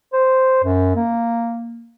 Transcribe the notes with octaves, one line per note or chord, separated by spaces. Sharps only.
C5
F#2
A#3